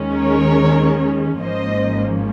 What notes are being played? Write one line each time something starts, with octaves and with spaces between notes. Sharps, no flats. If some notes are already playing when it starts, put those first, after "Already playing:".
Already playing: D#2 D#3 G#3 C#4
A#4 C#5
G#1 G#2 F3 A#3 C#4 C5 D#5